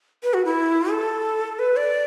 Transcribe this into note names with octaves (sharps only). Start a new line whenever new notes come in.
B4
F#4
E4
A4
B4
D5